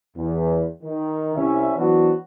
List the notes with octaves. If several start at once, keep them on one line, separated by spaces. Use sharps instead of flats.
E2
D#3
C2 C#4 E5
E3 F#3 B3 C4 D4 F#4